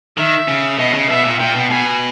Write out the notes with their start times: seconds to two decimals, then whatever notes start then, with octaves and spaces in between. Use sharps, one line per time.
0.17 D#3 E5
0.48 C#3
0.78 B2 D#5
0.93 C#3
1.09 B2 E5
1.25 A#2
1.40 A#2 G5
1.55 B2
1.70 B2 G#5